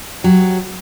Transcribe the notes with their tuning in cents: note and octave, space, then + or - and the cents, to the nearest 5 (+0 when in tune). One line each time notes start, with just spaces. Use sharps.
F#3 +0 G4 -5